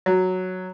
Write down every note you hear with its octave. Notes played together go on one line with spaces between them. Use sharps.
F#3